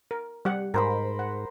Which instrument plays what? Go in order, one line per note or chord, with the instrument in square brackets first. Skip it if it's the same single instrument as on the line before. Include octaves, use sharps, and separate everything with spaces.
[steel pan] A#4
G3 G4 F#5
[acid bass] G#2 [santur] A#4 C5 B5
[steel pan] F#5